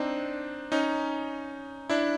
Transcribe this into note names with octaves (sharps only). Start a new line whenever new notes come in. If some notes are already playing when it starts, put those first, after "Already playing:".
Already playing: C4 D4 D#4
C#4 D#4
D4 E4